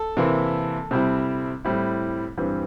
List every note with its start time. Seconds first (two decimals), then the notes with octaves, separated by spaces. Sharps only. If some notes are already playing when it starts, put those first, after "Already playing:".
Already playing: A4
0.17 C3 E3 A#3 E4
0.91 C3 G3 C4 E4
1.65 A2 G3 C4 E4
2.38 G2 E3 G3 C4